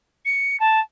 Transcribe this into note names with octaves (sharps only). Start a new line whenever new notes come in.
C#7
A5